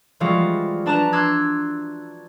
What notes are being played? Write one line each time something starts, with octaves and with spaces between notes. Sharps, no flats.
E3 F3 G3 G#3 F4 F#4
D4 B4 A5 A#5 F#6 E7
C6 D6 E6 F#6 G#6